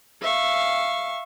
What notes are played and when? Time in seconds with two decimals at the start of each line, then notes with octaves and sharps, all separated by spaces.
0.22 E5 F5 C#6